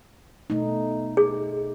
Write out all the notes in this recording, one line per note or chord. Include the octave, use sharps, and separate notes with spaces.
B2 A3 D#4
G#4